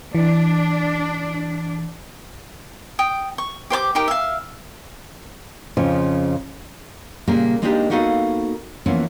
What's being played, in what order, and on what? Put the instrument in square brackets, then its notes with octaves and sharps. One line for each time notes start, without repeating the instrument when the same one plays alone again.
[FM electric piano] E3 [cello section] D4
[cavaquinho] G5 D#6
C#6
G4 C5 D5 D6
D#4 G4 A#4
E5 F5
[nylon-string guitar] F2 C#3 F3
A#2 C#3 G3 A#3
G#3 A#3 D4 D#4 F#4 G4
A#3 B3 D#4 F#4 A4 F5
C3 E3 F3 A#3 B3 C#4